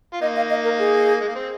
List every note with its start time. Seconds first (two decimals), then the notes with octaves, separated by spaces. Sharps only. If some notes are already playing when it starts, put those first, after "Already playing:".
0.13 F4
0.21 A#3 D#4 D#5
0.36 F5
0.50 D#5
0.64 A#4
0.79 G#4
1.21 G#3
1.28 A#3
1.35 C4